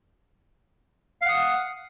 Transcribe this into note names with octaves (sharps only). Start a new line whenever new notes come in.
F5 F#5 D#6